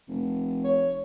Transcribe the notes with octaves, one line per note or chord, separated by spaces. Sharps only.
F1
C#5